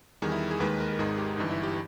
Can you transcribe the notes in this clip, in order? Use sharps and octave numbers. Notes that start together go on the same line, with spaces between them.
E2 D#3 G3 G#4
E4
G#4
D#2 D#3 G#3 B4
A#4
A#4
G#1 G#2 D#3 G#3 G#4
G4
G1 G2 E3 D#4
E4
G4